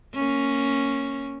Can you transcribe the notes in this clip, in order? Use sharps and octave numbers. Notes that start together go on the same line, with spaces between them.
A#3 C#4